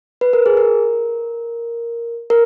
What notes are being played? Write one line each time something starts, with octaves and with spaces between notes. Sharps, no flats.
B4
A#4
G#4
A#4
A#4